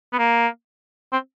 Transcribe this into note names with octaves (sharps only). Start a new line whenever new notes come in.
B3
A#3
C4